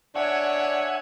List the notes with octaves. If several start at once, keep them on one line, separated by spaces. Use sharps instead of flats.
D4 C#5 E5 F#5 G#5